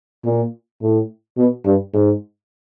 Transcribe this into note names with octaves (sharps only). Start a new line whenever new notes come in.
A#2
A2
B2
G2
G#2